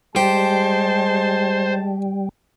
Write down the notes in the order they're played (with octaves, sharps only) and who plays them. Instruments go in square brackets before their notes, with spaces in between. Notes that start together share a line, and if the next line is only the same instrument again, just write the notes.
[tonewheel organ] G3 [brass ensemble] G#3 A5 [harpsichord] G4 [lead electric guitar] C5